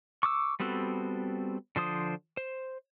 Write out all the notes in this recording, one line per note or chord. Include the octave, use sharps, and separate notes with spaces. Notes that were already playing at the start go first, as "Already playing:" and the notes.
C#6 D6 E6
G3 B3 C4 F#4 A4
D3 F3 C5 D#6
C5